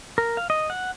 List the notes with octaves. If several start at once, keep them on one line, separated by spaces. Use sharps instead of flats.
A#4
F5
D#5
F#5